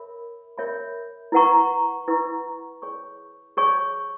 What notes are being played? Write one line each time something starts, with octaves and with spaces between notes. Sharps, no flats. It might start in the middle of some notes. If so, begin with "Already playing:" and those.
Already playing: A#4 C#5 E5 B5
A#4 C#5 E5 B5
E4 B4 F#5 A#5 C#6
E4 B4 F#5 A#5 C#6
G#4 C#5 G#5 C#6
G#4 C#5 G#5 C#6